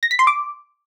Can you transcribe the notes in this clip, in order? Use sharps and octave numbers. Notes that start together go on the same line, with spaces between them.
A#6
B6
C6
D6